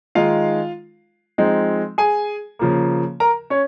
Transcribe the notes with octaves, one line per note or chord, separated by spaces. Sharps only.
D#3 G#3 D#4 F4 F5
F3 G#3 C4 D#4
G#4 G#5
C#3 F3 A#3
A#4 A#5
C#4 C#5